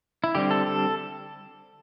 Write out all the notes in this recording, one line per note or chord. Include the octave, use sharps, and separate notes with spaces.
E4
D3 G3 C4 G4
A4
A4